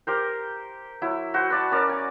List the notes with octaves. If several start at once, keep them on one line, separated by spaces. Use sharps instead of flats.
G4 A#4 C5
F#3 E4
F#4 C5
B4 D5 A5
C#4 A#4 D5
G#5